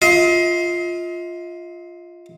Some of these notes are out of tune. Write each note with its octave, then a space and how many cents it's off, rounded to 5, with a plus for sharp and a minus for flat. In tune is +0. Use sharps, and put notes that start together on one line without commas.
F4 +0 D#5 +40